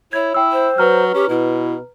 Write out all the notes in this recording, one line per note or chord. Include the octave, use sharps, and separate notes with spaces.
E4 C#5 G#6
E4 G5 E6
C5
F#3 B4 A#5 F6
C#4 G4
B2 E4